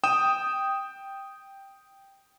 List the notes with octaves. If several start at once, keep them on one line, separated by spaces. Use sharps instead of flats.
G5 D#6 E7